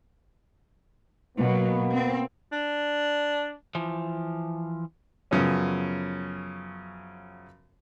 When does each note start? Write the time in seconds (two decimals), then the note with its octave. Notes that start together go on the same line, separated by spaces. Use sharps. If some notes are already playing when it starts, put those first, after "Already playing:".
1.37 B2 F#3 A#3 B3
1.91 C4
2.52 D4
3.75 E3 F3
5.31 F#2 C#3 F3 B3 C#4